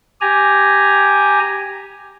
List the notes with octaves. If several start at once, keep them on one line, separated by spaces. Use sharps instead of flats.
G4 G#5 A#5